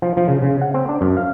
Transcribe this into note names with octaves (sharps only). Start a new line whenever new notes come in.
F3
F3
C#3
C#3
F#5
C4
D4
F#2
F5